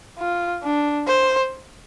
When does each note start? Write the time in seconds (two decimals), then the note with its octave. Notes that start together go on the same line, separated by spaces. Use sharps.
0.19 F4
0.63 D4
1.07 C5